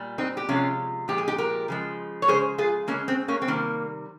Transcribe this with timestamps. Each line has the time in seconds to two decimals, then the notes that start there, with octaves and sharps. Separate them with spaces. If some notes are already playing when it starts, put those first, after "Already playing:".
Already playing: A#2 G3
0.18 C4 D#4
0.37 G4
0.49 C3 F3 G#3 C#4 F4
1.08 A#2 F3 G#3 G4
1.18 G#4
1.28 D#4 G4
1.38 G4 A#4
1.68 C#3 F3 G#3
2.22 C#5
2.28 C#3 F3 G#3 G#4 C5
2.58 F4 G#4
2.88 C#3 G#3 A#3 C#4
3.08 C4
3.28 A#3 C#4
3.42 C4
3.47 C3 D#3 G3 A#3